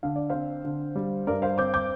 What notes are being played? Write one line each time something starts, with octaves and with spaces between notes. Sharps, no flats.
D3 F5
D5
C4 C5 F5
D3
G3
G2 A#4 D5
C5 F5
C4 D6 G6
D6 G6